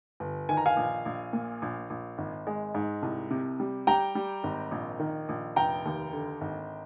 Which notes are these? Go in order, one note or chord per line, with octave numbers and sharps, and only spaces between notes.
G1
D#3 G#5
A#5
F5 G#5
A#1
A#1
A#2
A#1
A#1
G#1
G#3
G#2
C2
C3
G3
G3 G5 A#5
G3
G#1
A#1
D#3
A#1
F1 G5 A#5
D#2
D3
G#1